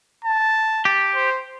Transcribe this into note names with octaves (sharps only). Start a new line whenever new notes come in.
A5
G4
C5